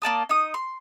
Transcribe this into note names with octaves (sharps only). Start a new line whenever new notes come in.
A#3 D5 A5 D#6
D#4 D#6
C6